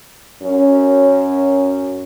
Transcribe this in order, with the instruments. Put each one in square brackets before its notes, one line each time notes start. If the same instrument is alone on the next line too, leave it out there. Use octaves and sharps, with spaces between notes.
[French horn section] F#2 C#4